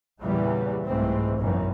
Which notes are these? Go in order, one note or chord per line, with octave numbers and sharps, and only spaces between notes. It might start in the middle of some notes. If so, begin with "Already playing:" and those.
E2 A#2 C#3 E3 G3
C2 G#2 E3 A3 C4
G#1 F#2 B2 D#3 E3